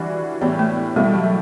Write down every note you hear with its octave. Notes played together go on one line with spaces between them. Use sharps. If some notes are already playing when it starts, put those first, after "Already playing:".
Already playing: E3 G3 D4 F#4
A2 E3 G3 B3 D4 G4
A3
B2 G3 A3 E4 G4
F#3